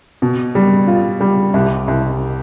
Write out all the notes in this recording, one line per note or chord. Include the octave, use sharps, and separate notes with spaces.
B2
G3
F4
G3
C2
C2